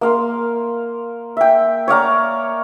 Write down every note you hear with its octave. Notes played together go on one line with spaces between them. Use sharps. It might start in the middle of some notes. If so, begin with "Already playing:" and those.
A#3 F5 C6
E5 G5
C#5 D5 F5 A#5